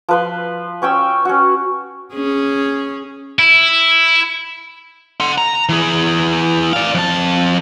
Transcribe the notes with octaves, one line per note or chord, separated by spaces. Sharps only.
F3 B4 C6
C#4 C#5 G5 E6
C#4 F#4
C#4 G#4
E4
F#5 C6
A#5
E3 G#4
D5 F5
F2 A5